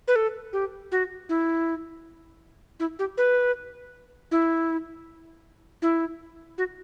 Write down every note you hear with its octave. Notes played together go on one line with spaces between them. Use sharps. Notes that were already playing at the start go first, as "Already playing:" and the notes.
B4
A4
G4
F#4
E4
E4
G4
B4
E4
E4
F#4